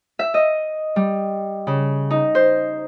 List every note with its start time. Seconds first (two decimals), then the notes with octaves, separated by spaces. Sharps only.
0.19 E5
0.34 D#5
0.96 G3
1.67 C#3
2.11 D#4
2.35 C5